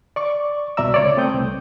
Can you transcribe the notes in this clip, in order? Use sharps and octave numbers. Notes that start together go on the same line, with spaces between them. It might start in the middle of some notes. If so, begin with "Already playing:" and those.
D5 C#6 D6
C2 B2 D5 E5 A#5 E6
C#2 C#5 D5
A3 C4 D#6 G6
C2